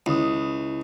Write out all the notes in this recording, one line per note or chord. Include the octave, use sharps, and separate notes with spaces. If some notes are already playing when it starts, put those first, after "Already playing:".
C#2 E4 D#6